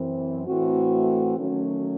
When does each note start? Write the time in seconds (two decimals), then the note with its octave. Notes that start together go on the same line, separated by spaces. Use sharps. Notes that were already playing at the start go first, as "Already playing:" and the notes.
Already playing: F#2 E3 C4
0.46 A2 E3 A3 C4 F#4
1.36 D#3 F#3 A3 C#4